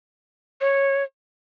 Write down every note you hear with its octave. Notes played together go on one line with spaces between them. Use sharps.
C#5